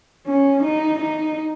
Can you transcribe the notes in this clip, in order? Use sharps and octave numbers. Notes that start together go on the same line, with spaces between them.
C#4
D#4
D#4